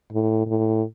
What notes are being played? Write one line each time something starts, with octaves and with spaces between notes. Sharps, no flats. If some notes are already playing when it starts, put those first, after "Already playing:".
A2
A2